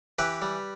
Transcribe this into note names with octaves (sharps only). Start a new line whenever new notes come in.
E3 G4 B4
G3